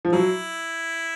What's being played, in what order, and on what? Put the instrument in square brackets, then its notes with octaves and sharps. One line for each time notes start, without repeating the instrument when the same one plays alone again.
[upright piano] F3
[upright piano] F#3 [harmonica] E4